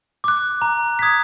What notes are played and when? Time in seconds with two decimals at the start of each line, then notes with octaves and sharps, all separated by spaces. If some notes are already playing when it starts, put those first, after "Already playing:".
0.24 D6 F#6
0.62 A#5
0.99 D#6 G#6 B6